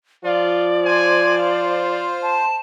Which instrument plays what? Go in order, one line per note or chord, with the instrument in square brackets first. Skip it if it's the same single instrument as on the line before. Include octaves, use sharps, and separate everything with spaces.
[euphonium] F3 [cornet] F4 [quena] D5
[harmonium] C5 [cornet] G#5
[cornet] F4
[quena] A5